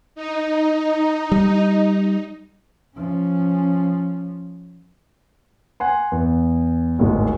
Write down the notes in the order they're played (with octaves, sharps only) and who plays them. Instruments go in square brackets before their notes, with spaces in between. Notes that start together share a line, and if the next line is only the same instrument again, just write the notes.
[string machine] D#4
[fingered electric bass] G3
[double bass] F3 C#4
[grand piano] F#5 G#5 C6
E2
D1 G#1 D#2 G#3